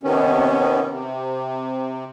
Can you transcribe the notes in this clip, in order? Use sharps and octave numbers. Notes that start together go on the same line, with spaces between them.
C3 D#3 B3 C#4
C3